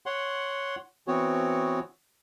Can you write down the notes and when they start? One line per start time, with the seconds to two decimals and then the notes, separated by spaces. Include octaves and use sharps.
0.06 C#5 F#5 C6
1.08 E3 B3 C4 F#4 C#5